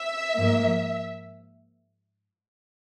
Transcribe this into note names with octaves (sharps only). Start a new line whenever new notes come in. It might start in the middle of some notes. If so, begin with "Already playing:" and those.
Already playing: E5
G#2 F3 A#3